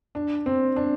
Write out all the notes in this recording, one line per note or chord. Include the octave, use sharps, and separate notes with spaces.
D4
C4
D4